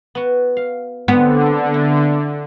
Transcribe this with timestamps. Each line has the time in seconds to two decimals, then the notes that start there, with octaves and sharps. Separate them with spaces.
0.15 B3 F#4
0.57 F5
1.08 D3 B3 C4 B4
1.74 E4